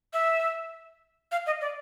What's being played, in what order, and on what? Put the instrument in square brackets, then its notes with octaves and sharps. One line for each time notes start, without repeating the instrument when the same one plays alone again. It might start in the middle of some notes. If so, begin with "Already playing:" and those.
[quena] E5
F5
D#5
D5